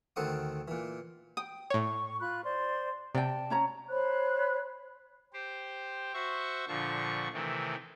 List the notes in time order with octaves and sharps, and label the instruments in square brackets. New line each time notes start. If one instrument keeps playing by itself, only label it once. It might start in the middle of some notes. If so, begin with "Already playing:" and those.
[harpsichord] D2 D#3 C4 A4 F#5 D#6
A#2 E3
[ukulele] G5 [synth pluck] D#6
[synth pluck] A2 C#5 [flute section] C#6
[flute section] F4 B5 F#6
C5 D5 C6
[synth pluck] C3 [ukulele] D5 G5 [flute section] A5
[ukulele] C#4 C#5 A#5
[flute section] C5 C#5 B5 F#6
[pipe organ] G4 C5
F#4 C5 E5 C#6
A#2 D3 F3 C#6
C3 D#3 E3 A3